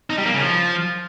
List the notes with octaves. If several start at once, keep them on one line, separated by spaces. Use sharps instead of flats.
D#4
G3
A#3
C#3
F3